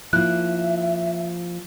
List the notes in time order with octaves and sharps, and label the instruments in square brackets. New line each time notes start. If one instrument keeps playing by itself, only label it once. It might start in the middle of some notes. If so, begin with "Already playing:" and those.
[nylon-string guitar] F3 A#3 E4 [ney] E5 [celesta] F#6